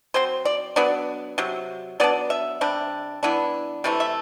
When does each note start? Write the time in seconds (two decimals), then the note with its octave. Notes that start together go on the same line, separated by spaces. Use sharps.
0.14 F#3 C4 C5
0.45 D5
0.76 F#3 B3 D4 D5
1.38 C3 F#3
2.00 F#3 B3 D4 D5
2.30 E5
2.61 C3 G3 D4
3.23 E3 B3 D4
3.84 C3 E3 A3 D5
4.00 E5